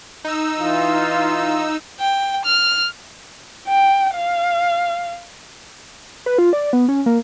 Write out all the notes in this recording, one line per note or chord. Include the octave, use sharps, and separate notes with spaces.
D#4 E6
E3 F4
G5
F6
G5
F5
B4
F4
D5
B3
C#4
A#3